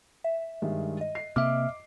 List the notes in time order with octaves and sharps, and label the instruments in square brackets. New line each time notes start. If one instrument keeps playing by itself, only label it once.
[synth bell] E5
[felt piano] G2 D#3 G#3
[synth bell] D#5
[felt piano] C7
[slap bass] C3 A#3 [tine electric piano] E5 F6 [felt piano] D6